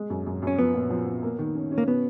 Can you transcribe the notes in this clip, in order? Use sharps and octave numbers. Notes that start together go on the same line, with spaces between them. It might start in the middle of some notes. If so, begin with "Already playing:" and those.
Already playing: G#3
F#2
F#2
F#2 C#4
F3 B3
A#2
F3
F3
A#3
D#3
C#4
C#4
A#3
B2 B3